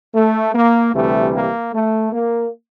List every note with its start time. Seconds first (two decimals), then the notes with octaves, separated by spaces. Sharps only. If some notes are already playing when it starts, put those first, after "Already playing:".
0.15 A3
0.54 A#3
0.94 D2 C3 E3 G3 A3
1.34 A#3
1.74 A3
2.13 A#3